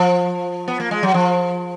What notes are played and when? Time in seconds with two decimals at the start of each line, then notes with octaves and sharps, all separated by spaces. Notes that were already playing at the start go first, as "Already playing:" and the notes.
Already playing: F3
0.68 B3
0.80 A#3
0.91 G#3
1.03 F#3
1.14 F3